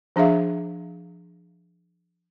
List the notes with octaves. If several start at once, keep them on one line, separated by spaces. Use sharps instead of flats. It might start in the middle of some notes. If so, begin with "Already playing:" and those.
F3 D4 G#4 E5 F5